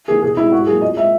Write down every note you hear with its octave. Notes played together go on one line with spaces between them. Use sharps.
E3 A#3 G#4
B2 G#4
G#3 E4
G#2 F#4
F#3 A#3 G#4
A#2 D#5
G#3 E5